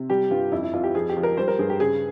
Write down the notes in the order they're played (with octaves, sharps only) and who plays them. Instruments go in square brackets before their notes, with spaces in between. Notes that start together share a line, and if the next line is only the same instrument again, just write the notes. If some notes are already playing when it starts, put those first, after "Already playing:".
Already playing: [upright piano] C3
G3 G4
G2 F4
F2 E4
E4
F2 F4
G4
F3 G#4
G4
F3
A#4
G3 C5
A#4
G2 G#4
G4
C#3 G#4